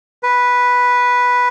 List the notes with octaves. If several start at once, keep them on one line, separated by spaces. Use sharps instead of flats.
B4